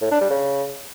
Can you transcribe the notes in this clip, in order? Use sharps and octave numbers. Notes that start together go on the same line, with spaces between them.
A2
D4
G3
C#3